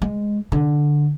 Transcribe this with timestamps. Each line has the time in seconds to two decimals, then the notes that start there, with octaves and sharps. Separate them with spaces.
0.02 G#3
0.52 D3